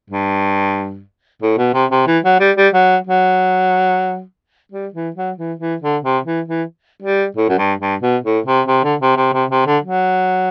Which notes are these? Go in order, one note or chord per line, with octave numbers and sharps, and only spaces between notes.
G2
A2
B2
C3
C3
E3
F#3
G3
G3
F#3
F#3
G3
E3
F#3
E3
E3
D3
C3
E3
E3
G3
A2
F#2
G2
G2
B2
A2
C3
C3
D3
C3
C3
C3
C3
D3
F#3